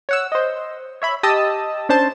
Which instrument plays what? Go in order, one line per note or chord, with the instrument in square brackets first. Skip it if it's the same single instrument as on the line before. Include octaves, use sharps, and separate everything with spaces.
[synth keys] C#5 F#5 E6
C5 D#5
C#5 E5 B5
G4 D#5 A5 D#6 E6
C#4 D4 C5 A5